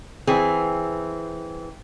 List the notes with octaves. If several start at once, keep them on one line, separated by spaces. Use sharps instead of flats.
E3 C4 G#4